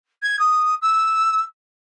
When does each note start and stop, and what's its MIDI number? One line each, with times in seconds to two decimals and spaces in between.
0.22 0.39 92
0.39 0.75 87
0.81 1.42 88